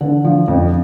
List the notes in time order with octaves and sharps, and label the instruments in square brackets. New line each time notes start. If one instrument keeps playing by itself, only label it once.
[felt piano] D3
F3
F2